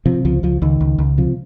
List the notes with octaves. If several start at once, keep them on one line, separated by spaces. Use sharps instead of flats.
C3 F3
C#2 F3
C#2 F3
C#2 D#3
C#2
C#2
C3 F3